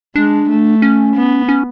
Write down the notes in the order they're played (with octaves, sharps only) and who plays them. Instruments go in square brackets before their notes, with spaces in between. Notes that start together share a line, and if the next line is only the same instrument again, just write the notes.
[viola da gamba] G#3 [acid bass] D4
[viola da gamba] A3
[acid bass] C#4
[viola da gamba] B3
[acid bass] C#4